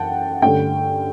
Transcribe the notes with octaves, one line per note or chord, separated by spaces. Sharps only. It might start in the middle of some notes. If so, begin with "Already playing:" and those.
Already playing: F#2 E3 F#5 G5 A5
G2 D3 A3 C#4 G5